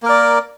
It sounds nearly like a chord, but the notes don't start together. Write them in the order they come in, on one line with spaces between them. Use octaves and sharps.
A#3 A#4 D5